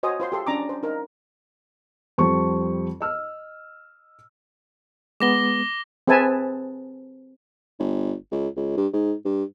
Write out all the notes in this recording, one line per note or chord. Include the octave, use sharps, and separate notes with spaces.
F#4 C5 C#5 D#5 G#5 D#6
F4 C5 C6
G4 A4 C6
C#4 D4 A#5 D6
C5
D#4 A#4
F2 G3 C4 C5 A5 C#6
D#5 E6 F6
G#3 B3 D6 A#6 G7
C4 G#4 B4 E5 G#5 A5
G1
C#2
C#2
G2
G#2
G2